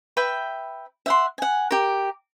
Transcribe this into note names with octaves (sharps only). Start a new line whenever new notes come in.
B4 E5 G5 B5
E5 F#5 C6
F#5 G#5
G4 A#4